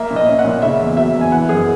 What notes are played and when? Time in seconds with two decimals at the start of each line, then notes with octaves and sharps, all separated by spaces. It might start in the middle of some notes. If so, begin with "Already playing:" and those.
Already playing: A#3 E5
0.11 A#2
0.16 D#5
0.28 C#4
0.39 F#5
0.45 A#2
0.62 C#3 E5
0.80 E2
0.97 F#3 E5
1.15 E2
1.21 G#5
1.32 E3 F#5
1.49 F#2 G#4